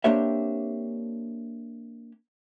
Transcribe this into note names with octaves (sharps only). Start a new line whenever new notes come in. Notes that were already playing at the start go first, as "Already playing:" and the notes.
A#3 C4 D4 G4 C#5 E5